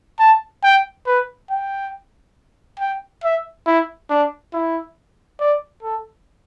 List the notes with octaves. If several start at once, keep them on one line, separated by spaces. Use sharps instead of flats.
A5
G5
B4
G5
G5
E5
E4
D4
E4
D5
A4